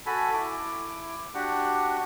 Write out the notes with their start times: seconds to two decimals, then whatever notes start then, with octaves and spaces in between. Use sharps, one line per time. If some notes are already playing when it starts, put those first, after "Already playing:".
0.06 F#4 A4 G#5 B5
0.34 E4 D6
1.34 D4 F#4 G4 F#5